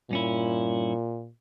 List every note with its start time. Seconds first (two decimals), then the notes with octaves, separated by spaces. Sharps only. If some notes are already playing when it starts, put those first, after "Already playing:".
0.11 G2 A#2 C#4 E4